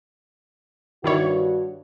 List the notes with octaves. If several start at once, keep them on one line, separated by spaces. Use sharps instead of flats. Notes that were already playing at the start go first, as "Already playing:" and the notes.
G2 D#3 E4 F#4 C#5